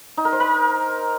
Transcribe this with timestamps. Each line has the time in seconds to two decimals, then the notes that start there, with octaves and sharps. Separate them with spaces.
0.17 D#4
0.25 A#4
0.32 C5
0.40 A#4